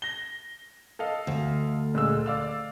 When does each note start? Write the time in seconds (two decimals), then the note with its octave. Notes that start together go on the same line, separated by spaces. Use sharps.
0.02 A#6 G7
0.99 A4 D#5 F5
1.27 D2
1.95 A#2 G#3 E6
2.26 D5 F5 E6